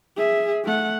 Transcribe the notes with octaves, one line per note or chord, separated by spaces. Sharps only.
G#4 E5
A3 F#5